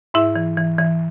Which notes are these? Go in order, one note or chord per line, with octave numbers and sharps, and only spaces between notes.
G#2 E4 E5
E3
E3
E3